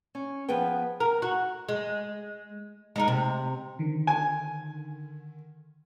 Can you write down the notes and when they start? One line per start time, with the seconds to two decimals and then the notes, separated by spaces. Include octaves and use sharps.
0.15 C#4
0.48 F3 B3 G#4 B4 G5
1.00 A#4
1.22 F#4
1.69 G#3
2.96 G#3 D#4 A#4
3.08 C3
3.79 D3 D#3
4.07 G#5